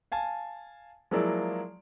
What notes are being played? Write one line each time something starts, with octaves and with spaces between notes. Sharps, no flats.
F5 G#5 A5
F3 F#3 G#3 A#3 E4 D5